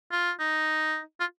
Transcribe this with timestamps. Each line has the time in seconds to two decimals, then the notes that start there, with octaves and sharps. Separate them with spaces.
0.11 F4
0.40 D#4
1.20 F4